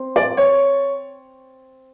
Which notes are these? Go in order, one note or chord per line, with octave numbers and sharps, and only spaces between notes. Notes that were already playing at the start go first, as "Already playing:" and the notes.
Already playing: C4
D5
C#5